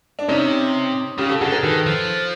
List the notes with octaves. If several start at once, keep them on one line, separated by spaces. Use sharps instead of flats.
D4
C3 C#4 D#4
C#3 F4 G4
G4 A4
D3 F#4 G#4
G#4 A#4
D#3 A4 B4
F3